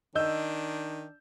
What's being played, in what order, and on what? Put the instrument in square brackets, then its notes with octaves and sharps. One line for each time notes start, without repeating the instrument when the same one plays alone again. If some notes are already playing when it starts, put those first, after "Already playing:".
[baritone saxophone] D#3 [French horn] D4 [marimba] D#5 [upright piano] E6 G6